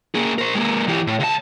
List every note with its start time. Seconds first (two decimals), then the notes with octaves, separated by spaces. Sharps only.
0.15 A#3 G#4
0.38 A#4 C5
0.54 G#3 A#3
0.88 E3 G4
1.07 A2
1.19 C#2 A5